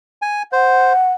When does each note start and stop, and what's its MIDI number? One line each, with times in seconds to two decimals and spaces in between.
0.22 0.43 80
0.53 0.93 72
0.53 1.12 78